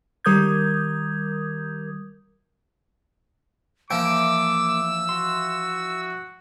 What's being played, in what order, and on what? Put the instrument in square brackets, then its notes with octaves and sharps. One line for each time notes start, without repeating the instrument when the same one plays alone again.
[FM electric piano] D#3 G3 A#4 D#6 G6 G#6
[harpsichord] E3 F3 [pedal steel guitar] A#3 G5 [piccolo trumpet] D6 [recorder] E6
[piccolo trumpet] F#4 [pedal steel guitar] C6